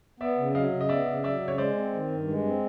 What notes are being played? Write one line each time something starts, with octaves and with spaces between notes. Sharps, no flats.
B3 D5 E5
C#3
F#3 D#5 F5
C#3
D#5
B3 D5 E5
C#3
F#3 D5 E5
C#3
C#5
G#3 C5 D5
C4
D#3
G2
G#3
C4